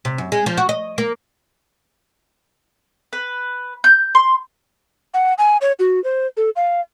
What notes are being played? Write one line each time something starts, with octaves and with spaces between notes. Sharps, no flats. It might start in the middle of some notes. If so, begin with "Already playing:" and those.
C3
F#2
G#3
F3
F#4
D#5
A#3
B4
G6
C6
F#5
G#5
C#5
F#4
C5
A4
F5